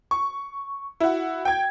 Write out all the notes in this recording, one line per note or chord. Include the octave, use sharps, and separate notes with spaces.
C#6
E4 F#4
G5 G#6